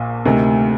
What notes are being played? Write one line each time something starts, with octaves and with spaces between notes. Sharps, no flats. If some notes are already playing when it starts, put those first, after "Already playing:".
Already playing: A#1 A#2
D2 C3 D#3